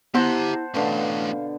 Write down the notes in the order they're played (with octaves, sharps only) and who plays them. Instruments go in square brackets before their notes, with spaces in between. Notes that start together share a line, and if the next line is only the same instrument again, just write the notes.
[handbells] B3 [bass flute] E4 [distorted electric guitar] G4 A#5 [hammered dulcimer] C5 F#5 A5
[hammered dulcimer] B2 D3 [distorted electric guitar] A3 C#4 [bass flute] F5